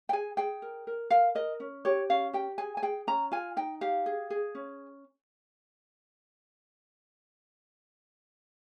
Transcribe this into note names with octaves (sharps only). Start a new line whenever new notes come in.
G5
G#4 G#5
G#4 G5
A#4
A#4
A#4 F5
A#4 D#5
C#4
G4 C#5
C#4 F5
G4 G5
G#4 G#5
G#5
G#4 G5
C#4 A#5
F4 G#5
D#4 G5
G4 F5
G#4
G#4
C#4